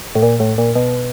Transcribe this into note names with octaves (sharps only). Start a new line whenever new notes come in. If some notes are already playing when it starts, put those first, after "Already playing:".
A2
A#2
A2
A#2
B2